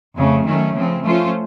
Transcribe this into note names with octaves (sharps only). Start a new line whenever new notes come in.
F2 C#3 A3
D#3 F#3 A3 C#4
C#3 F3 C4
F3 A3 C#4 F4 C5